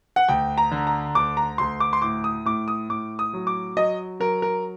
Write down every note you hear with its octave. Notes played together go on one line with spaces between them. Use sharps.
F#5
D2 G5
A#5
D3
A#5
D2 D6
A#5
D2 C6
D6
C6
A2 D6
D#6
A2 D6
D#6
A2 D6
D#6
F#3
D6
F#3 D#5
F#3 A#4
A#4